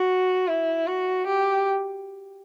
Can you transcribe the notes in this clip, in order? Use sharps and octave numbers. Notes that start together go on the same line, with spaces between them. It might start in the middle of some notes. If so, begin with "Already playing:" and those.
Already playing: F#4
E4
F#4
G4